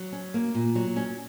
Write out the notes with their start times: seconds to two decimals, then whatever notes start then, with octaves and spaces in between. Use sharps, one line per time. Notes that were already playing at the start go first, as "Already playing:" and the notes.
Already playing: F#3
0.12 C#4
0.34 A#3
0.55 A#2
0.75 F#3
0.96 C#4